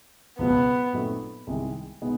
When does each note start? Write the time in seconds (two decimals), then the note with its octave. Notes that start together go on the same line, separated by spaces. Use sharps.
0.39 C#2 B2 F#3 B3
0.93 A#2 F#3 A3 C4 D#4
1.47 C2 C3 D#3 G#3
2.01 B2 G#3 B3 D#4